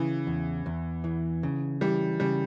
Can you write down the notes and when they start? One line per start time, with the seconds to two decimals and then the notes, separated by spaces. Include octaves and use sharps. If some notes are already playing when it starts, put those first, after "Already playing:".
Already playing: C#3 E3
0.27 E2
0.66 E2
1.04 E3
1.43 C#3
1.81 E3 G3
2.20 C#3 G3